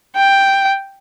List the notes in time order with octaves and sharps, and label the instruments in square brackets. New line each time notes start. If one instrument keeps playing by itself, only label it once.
[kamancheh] G5